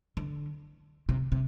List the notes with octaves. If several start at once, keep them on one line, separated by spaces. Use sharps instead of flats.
D3
C3
C3